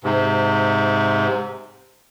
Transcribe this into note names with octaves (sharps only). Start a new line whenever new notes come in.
G#2 C3